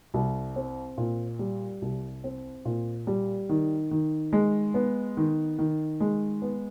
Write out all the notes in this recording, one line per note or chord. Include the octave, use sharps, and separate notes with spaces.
C2
C4
A#2
G3
C2
C4
A#2
G3
D#3
D#3
G#3
B3
D#3
D#3
G#3
B3